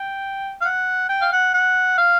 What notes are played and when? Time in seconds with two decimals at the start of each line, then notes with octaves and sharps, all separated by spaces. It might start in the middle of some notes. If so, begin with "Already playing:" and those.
Already playing: G5
0.62 F5
0.65 F#5
1.09 G5
1.21 F5
1.32 F#5
1.53 F#5
1.98 F5